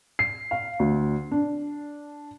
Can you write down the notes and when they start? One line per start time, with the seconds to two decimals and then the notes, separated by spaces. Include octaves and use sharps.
0.19 C7
0.51 F5
0.80 D2
1.31 D4